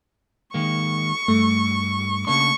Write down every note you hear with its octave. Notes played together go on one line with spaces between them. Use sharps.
D#3 G#3 A#3 C#6
G2 A3
C#3 A#3 D4 C#6